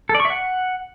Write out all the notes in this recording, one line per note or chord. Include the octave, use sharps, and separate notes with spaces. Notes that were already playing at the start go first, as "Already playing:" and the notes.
A4
D5
C#6
E5
F#5